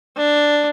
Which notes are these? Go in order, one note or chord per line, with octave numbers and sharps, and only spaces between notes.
D4